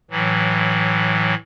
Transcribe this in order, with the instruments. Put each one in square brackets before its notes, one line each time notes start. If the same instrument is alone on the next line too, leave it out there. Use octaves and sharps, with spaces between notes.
[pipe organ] A2 E3 F#3